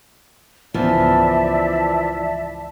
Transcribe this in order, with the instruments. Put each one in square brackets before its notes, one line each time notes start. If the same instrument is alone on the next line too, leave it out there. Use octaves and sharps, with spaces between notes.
[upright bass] C#2 G#2 [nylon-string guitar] E3 F3 B3 [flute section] D5 E5 A5